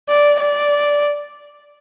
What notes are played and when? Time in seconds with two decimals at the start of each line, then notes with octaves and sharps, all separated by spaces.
0.09 D5
0.40 D5